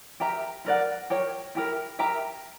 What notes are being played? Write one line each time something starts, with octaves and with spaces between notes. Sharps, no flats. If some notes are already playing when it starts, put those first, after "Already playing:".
G4 A#4 E5 A#5
E4 A#4 D5 F#5
G4 A#4 C#5
E4 G4 A#4
G4 A#4 E5 A#5